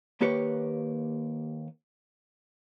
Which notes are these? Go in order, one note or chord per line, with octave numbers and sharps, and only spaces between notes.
D#2 A#3 G4 B4 C#5